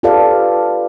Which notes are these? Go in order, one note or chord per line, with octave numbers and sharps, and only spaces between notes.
F4 G4 A4 B4 D5 F5